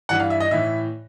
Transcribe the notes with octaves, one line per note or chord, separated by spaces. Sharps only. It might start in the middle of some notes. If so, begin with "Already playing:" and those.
G2 E3 F#5
F5
E5
D#5
A2 E3 E5